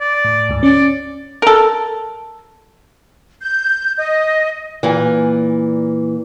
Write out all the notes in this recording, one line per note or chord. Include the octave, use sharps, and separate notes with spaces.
D5
A2
D2 G#2
C#4 D5
A4 A#4
G6
D#5
A#2 E3